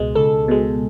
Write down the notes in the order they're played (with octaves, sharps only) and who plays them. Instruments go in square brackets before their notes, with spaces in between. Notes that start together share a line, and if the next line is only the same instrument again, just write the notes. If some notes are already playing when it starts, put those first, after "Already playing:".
Already playing: [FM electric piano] C#2 B2 G#3
[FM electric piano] C#2 [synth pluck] A4
[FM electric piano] B2 G#3